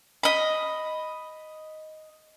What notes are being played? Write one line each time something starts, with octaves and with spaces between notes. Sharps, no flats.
D#5 B5